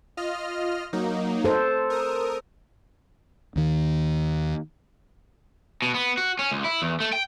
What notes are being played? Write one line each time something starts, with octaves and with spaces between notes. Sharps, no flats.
F4 D#5 F6
F#3 A#3 D#4
A4 C5
A#4 D#6
D#2 D#3
B2
B3
F#4
C#4
C#2
E4
E2
A3
G5